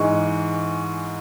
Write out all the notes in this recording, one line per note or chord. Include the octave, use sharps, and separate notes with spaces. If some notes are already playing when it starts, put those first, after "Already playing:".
Already playing: G#2 E3 G#3 C#6